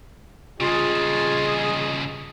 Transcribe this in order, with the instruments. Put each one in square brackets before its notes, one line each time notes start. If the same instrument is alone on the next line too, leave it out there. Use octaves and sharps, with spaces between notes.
[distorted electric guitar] G2 C#3 [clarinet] F4 [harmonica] G#4 D#5